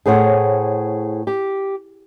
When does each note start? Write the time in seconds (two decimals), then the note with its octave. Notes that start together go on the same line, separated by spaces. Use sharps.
0.06 A2 G#4 C5 C#5 F#5
1.27 G4